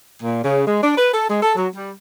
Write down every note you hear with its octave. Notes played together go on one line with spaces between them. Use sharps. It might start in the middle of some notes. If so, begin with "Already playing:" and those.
A#2
C#3
G#3
D4
B4
A4
G#3
A4
F#3
G3